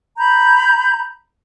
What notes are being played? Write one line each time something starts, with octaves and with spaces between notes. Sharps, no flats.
A#5 B5 G6